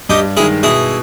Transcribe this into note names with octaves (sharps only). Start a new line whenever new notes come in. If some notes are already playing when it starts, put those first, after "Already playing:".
G2 D#4 G4
D#3 G#3 E4 G#4
B2 E4 G#4